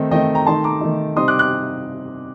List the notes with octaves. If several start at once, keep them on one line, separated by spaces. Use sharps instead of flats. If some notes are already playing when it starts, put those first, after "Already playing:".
Already playing: D#3 A3 C4 D#4
D#3 A3 C4 D#4 D#5 G5
G5 A#5
D#3 A3 D#4 A5 C6
A#5 D6
D#3 A3 D#4
C3 G3 C4 D#4 C6 D#6
D6 F#6
D6 F#6